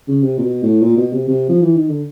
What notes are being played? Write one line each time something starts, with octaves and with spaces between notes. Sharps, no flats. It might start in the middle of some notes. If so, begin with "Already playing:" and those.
C#3
C3
A#2
B2
A2
A#2
B2
C3
C3
F3
E3
D#3
D3